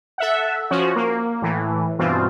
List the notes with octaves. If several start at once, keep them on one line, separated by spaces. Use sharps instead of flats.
A4 E5 F#5
F3 C#4 F#4
A#3
A2 E3
G2 B2 E3 C4 F4